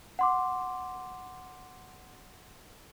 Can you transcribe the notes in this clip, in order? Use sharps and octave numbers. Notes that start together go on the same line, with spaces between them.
F#5 C6 D6